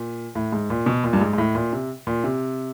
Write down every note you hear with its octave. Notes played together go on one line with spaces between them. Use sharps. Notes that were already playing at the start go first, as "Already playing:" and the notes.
Already playing: A#2
A2
G#2
A#2
B2
A#2
G2
G#2
G#2
A2
A#2
C3
A#2
C3